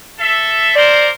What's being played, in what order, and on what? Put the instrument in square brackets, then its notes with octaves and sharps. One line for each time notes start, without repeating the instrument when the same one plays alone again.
[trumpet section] A4 E5
[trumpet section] A#4 C5 [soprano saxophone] D5